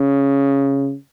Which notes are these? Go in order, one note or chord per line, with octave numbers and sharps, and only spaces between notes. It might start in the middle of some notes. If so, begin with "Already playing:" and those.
Already playing: C#3